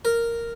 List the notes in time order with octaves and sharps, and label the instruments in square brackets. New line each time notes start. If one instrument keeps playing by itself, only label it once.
[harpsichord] A#4